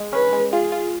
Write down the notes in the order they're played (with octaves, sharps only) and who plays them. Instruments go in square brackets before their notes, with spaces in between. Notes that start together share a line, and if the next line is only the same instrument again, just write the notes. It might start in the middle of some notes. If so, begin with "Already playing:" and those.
Already playing: [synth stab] G#3
[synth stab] C#4 [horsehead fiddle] B4
[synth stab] G#3
[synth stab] F4 [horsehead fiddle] G#4
[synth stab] F4